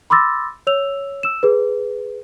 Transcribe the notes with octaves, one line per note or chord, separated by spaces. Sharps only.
B5 C6 D6 E6 A6 A#6
C#5 E6 F7
E6 E7
G#4 B4